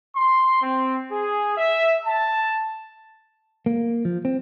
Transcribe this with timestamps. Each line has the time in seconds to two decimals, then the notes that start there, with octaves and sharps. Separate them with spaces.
0.15 C6
0.62 C4
1.11 G#4
1.57 E5
2.06 A5
3.66 A#3
4.05 F3
4.25 C4